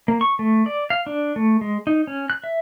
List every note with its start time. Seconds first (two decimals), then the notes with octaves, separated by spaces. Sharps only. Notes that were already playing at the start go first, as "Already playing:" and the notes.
0.08 A#3
0.21 C#6
0.39 A3
0.66 D5
0.90 F5
1.07 D4
1.36 A3
1.61 G#3
1.87 D#4
2.07 C#4
2.30 F#6
2.44 E5